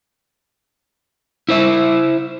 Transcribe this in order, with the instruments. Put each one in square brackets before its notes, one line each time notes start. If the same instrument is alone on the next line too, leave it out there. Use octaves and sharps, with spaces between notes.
[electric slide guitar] E4 C5 E5